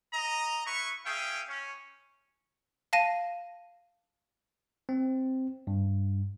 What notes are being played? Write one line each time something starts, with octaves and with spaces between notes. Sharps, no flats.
D#5 A#5
E4 B4 C#6
C#4 G#4 E5 F5 G5
C#4
F5 A5 A#6 D#7
C4
G2